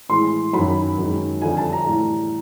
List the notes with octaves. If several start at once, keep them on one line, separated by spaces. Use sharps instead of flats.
A2 E3 G#3 C6
F#2 D#3 F#3 B5
F#2 D#3 G#3
F2 D3 G3 G#5
A5
A#5
A2 E3 G3